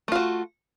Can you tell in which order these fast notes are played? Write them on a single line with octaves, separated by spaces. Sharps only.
A3 F4 F#4